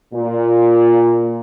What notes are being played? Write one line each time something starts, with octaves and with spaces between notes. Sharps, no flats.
A#2